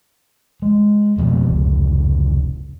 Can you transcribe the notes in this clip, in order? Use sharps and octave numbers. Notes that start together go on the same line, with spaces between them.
G#3
F2 B2
F1 C#2